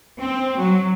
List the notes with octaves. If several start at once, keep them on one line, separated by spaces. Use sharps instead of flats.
C4
F#3